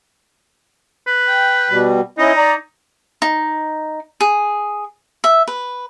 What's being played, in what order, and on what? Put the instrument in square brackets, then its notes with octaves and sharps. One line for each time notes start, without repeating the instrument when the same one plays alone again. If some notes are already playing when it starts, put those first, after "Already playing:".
[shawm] B4
[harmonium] G5
B2 G3
[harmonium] C#4 E4 D#5 [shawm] D#4
[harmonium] D5 A#5
[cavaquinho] D#4
G#4
E5
B4